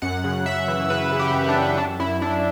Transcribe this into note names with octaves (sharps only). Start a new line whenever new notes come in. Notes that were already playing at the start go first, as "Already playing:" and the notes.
F#2 F#5
C#3
F#2 E5
E3
C#3 B4
C#3
G4
F#2
D4
F#2
F#2 D4
F#2 E4
F#2 D4